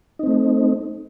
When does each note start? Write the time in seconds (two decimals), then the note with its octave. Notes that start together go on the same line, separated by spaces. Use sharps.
0.19 D#4
0.23 C4
0.27 A3